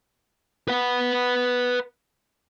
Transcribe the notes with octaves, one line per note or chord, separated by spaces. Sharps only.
B4 F#5